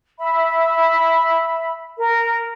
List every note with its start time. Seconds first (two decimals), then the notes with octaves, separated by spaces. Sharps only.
0.19 E5 B5
1.96 A#4